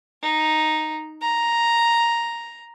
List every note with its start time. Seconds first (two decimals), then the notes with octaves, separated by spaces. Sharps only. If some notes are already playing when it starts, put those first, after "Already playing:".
0.22 D#4
1.21 A#5